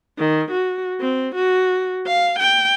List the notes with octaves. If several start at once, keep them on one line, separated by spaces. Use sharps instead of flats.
D#3
F#4
C4
F#4
F5
G5